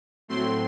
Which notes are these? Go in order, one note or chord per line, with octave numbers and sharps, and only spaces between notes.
A2 F#3 A3 C4 C6